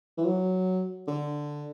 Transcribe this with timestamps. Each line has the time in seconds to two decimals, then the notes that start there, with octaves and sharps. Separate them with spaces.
0.18 E3
0.25 F#3
1.08 D3